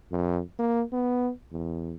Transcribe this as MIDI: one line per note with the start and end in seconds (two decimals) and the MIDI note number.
0.12 0.41 41
0.59 0.83 58
0.92 1.31 59
1.52 1.96 40